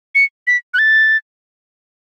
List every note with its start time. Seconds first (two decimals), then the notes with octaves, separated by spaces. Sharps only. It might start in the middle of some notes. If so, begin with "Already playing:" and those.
0.15 C#7
0.47 B6
0.74 F#6
0.79 A6